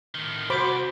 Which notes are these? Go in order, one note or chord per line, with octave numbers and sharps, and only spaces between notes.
A2 D#3
C2 F#4 C5 B5 D6